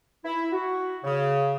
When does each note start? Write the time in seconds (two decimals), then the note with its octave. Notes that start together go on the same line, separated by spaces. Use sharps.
0.25 E4
0.52 F#4
1.04 C#3